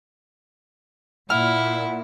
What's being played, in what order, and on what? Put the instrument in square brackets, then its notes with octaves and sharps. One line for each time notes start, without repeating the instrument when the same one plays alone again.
[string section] A#2 [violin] E4 [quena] F#5 [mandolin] F6